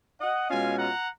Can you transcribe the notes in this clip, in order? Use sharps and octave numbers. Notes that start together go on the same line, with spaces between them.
D#5 F#5
B2 G#3 C#4 F4 F5 G#5
F#5 A#5